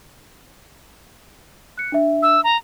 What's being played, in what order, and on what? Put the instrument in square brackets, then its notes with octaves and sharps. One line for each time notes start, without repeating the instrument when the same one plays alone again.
[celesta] F#6 C#7
D4 E5
[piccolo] E6
A#5